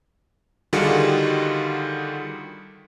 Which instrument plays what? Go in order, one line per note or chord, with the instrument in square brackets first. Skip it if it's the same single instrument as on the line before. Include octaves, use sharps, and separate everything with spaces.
[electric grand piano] D3 D#3 G3 F4 F#4 G#4